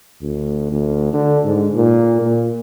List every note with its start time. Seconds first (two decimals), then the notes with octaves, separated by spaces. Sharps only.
0.22 D2
0.71 D2
1.13 D3
1.44 G#2
1.75 A#2
2.22 A#2